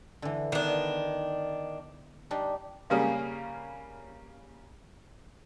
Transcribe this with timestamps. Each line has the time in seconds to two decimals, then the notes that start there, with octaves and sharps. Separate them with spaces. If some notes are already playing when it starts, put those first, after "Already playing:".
0.22 D3 E3
0.52 D#3 B3 D4
2.31 G3 D4 D#4
2.90 C#3 G3 A#3 C#4 G#4